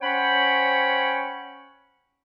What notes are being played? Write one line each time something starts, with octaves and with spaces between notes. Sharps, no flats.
C#4 C5 C#5 F#5 G5 B5